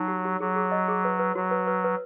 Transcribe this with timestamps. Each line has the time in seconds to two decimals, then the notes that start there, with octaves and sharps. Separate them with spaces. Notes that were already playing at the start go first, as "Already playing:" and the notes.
Already playing: F#3 D#4
0.08 G4
0.25 G4
0.40 F#3 G#4
0.56 G#4
0.72 D#5
0.88 G#4
1.05 B4
1.19 B4
1.35 F#3 F#4
1.51 B4
1.67 B4
1.84 B4